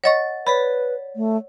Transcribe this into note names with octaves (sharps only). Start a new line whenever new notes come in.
C#5 D#5 F#5 C#6 A6
B4 C#5 D5 B5 B6
A3